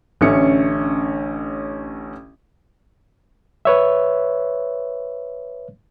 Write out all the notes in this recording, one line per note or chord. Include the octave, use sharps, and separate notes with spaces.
A1 D3 C#4 E5 C#7
B4 C#5 E5